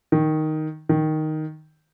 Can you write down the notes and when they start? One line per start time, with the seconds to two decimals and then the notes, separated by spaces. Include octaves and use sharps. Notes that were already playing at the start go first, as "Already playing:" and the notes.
0.12 D#3
0.89 D#3